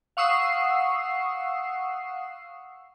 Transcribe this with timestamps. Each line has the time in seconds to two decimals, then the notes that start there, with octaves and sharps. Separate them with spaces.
0.17 F5 F#5 C#6 D#6 E6 C7